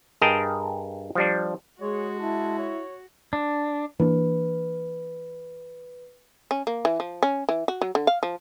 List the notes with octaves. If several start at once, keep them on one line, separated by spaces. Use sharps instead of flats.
G2 G#4 A#4 D#5 G5 A5
F3 G3 D4
G#3 F#4 G#4 C#5
E4 A5
C#5
D4
E3 A#3 D4 B4
C#4
A#3
E3
F3
C#4
E3
F#4
F#3
D3
F5
F3